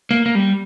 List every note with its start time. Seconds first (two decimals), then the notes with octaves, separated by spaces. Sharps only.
0.11 A#3
0.26 A#3
0.35 G3